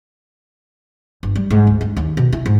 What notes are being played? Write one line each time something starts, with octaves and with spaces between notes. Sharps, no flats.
G1
G3
G#2
D2
G2
D#2
B2
E4
G#2